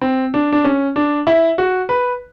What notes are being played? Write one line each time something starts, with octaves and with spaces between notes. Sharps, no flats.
C4
D4
D4
C#4
D4
E4
F#4
B4